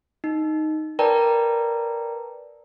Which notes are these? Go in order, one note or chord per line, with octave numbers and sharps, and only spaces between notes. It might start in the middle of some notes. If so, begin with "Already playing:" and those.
D#4
A#4 B4 D5 G5 A5 A#5